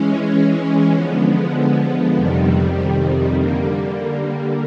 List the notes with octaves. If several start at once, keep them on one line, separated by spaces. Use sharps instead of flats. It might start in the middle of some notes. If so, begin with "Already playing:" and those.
Already playing: E3 G#3 C#4
D3 F3 G#3 B3
F2 C3 D#3 G3
D3 G3 A#3